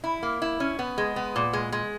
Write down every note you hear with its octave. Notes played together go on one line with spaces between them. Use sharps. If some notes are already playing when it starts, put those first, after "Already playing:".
E4
A#3
E4
C#4
B3
G#3
B3
A#2
G#3
G#3